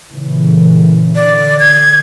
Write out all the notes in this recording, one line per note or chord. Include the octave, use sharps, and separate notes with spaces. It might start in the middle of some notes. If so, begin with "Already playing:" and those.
A#2 C#3 E3
D3 D5
G#6